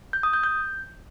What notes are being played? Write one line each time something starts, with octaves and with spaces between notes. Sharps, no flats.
G6
D#6
G6
G6